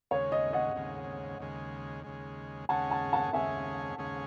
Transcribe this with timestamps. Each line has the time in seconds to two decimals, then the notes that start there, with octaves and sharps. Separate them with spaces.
0.11 D#2 C#3 G#3 C#5
0.32 D#5
0.53 D#5 F#5
0.75 D#2 C#3 G#3
1.40 D#2 C#3 G#3
2.04 D#2 C#3 G#3
2.69 D#2 C#3 G#3 C#4 G#4 F#5 A5
2.90 F#5 A5
3.13 F#5 A5
3.33 D#2 C#3 G#3 C#4 G#4 E5 G#5
3.98 D#2 C#3 G#3 C#4 G#4